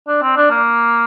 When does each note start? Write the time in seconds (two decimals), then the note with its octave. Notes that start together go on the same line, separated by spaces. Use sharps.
0.08 D4
0.22 C4
0.36 D4
0.51 A#3